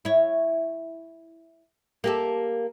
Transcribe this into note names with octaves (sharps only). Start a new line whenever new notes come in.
E4 C#5
A#3 G4 A4